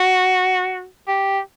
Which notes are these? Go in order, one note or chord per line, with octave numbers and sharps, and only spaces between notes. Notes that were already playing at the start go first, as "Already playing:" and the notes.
Already playing: F#4
G4